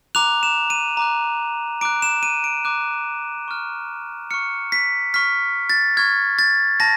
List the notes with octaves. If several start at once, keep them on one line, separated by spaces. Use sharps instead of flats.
A#5 D6 F#6 F7
E7
D#7
A#5 D6 F#6
A#5 D6 F#6 D7
E7
D#7
D7
A#5 D6 F#6
C#6 F6
C#6 F6 C#7
B6
C#6 F6 B6
A6
C#6 F6 G#6
A6
A5 A#6